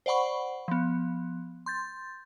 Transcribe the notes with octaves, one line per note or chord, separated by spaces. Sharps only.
C5 D5 F#5 B5 C#6
F3 B3
C6 G6 A6